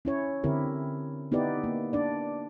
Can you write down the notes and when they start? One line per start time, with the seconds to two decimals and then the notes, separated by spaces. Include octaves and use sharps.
0.05 C#4 E4 C#5
0.44 D3 C4 E4 G4 A#4
1.32 B3 D#4 E4 G4 B4 D5
1.64 A#3
1.93 D4 D5